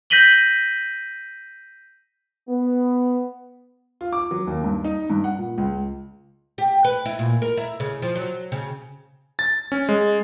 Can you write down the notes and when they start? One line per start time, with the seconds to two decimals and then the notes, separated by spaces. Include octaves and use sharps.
0.10 G6 A#6 B6 D#7 F#7 G7
2.48 B3
4.01 F4
4.13 D6
4.31 F#3
4.47 D#2
4.64 G2
4.85 D#4
5.10 G2
5.24 F#5
5.38 A#2
5.58 C#2
6.58 G4
6.84 B4
7.06 E4
7.19 A#2
7.42 A#4
7.57 E4
7.80 C#3
8.02 F3
8.16 F#3
8.52 C#3
9.39 A6
9.72 C#4
9.89 G#3